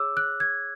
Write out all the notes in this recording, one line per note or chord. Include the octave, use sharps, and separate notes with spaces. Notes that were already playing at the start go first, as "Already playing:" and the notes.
Already playing: G#4 C#5 D6 E6
F#6
G#6